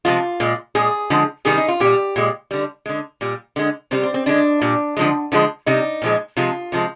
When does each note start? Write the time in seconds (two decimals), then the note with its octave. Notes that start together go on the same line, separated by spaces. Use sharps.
0.05 C3 F3 G#3 F4
0.40 A#2 G#3
0.75 A#2 G#3 G#4
1.10 D3 F3 G#3
1.45 C3 D#3 G3 G#4
1.57 D#4
1.68 F4
1.80 A#2 G3 G4
2.16 A#2 G#3
2.51 D3 G3
2.86 D3 G#3
3.21 A#2 G3
3.56 D3 G#3
3.91 C3 G3 C4
4.03 C4
4.14 C4
4.26 D3 G#3 D4
4.61 A#2 G3
4.97 D3 F3 G#3
5.32 D3 F3 G#3
5.66 C3 G3 D#4
6.02 A#2 F3 G#3
6.37 C3 F3 G#3 F4
6.72 C3 F3 G#3